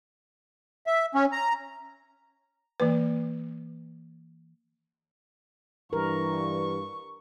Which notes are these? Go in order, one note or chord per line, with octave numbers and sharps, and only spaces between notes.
E5
C#4
A#5
E3 A#3 B4
G2 E3 A#4 C#6